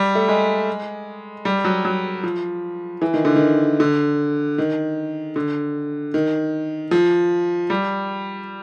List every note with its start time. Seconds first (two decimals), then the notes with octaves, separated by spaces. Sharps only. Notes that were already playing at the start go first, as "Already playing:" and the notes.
Already playing: G3
0.15 A3
0.29 G#3
1.45 G3
1.64 F#3
1.85 F#3
2.23 F3
3.02 E3
3.14 D#3
3.25 D3
3.36 D#3
3.80 D3
4.58 D#3
5.36 D3
6.14 D#3
6.91 F3
7.70 G3